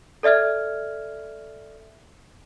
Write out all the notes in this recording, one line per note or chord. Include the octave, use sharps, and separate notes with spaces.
A4 D5 E5 F6 G#6